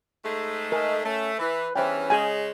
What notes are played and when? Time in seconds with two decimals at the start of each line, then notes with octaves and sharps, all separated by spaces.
0.24 G#2 G#3 A3
0.72 A#4 D#5 G#5
1.04 A3 C#4
1.39 E3 B4
1.76 E2 G2 E3 C#4 C5 G5
2.10 C#3 G#3 G#4 G#5